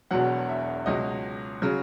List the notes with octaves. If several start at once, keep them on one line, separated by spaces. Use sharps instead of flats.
E1 E2 B2 F#3 F#5
E5
C#2 B2 F#3 D#5
C#3 F#3